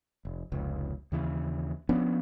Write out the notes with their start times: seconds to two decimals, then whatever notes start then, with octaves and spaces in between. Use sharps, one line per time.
0.25 F1
0.52 F1 C#2
1.12 D#2 C#3 E3
1.89 F3 B3 C#4 D4